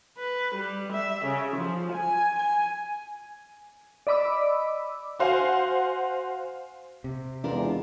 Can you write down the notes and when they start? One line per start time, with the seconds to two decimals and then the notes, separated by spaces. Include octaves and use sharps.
0.18 B4
0.55 G3
0.92 E5
1.25 C#3
1.56 F3
1.92 G#5
2.39 G#5
4.07 D5 D#5 B5 D6 E6
5.19 F#4 C5 F5 F#5 G#5
7.04 C3
7.44 E2 G#3 D4 F4 A#4